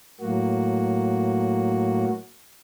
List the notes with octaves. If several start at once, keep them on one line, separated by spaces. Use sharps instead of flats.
A2 F#3 A#3 F#4